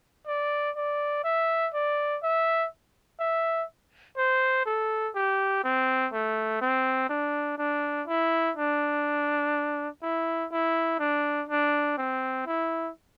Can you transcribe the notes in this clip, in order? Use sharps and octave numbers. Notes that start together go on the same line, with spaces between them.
D5
D5
E5
D5
E5
E5
C5
A4
G4
C4
A3
C4
D4
D4
E4
D4
E4
E4
D4
D4
C4
E4